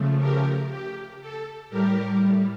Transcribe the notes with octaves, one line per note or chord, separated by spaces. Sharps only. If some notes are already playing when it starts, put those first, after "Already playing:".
Already playing: C#3 F3 A3
G4 A#4
G4
A4
A2 G3 G4 A#4